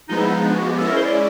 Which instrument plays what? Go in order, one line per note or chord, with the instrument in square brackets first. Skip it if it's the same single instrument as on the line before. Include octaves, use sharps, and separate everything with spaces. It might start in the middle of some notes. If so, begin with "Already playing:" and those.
[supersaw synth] F3 G#3 B3 [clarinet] D#4
[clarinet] E4
D#4
D4
F#4
G4
[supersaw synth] G#3 C#4 E4 [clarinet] A4
[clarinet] A#4
C5
D5